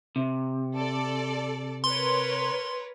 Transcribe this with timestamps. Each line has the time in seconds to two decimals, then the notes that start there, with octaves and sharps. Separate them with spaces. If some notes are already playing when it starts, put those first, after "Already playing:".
0.16 C3
0.74 A4 D5
1.84 A#4 B4 C#5 C6